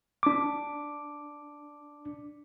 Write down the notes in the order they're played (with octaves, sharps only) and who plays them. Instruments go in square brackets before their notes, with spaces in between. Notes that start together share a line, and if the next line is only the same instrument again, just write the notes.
[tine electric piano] D4 D6